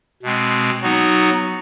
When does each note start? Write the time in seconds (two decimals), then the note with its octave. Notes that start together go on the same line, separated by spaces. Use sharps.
0.23 B2 G#3 C4
0.83 F#3 B3 D#4 F#4